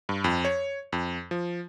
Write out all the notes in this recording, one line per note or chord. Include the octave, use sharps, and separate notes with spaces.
G2
F2
C#5
F2
F3